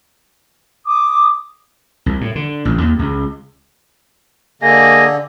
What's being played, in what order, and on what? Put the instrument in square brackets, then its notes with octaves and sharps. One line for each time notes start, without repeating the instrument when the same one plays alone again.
[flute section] D6 D#6
[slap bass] C2
A2
D3
A1
D#2
C#2
[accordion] D3 [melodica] A#3 G#4 D#5